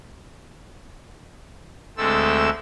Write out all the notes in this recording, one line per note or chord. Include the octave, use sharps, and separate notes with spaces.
D2 G#3 A3 C4 A4 E6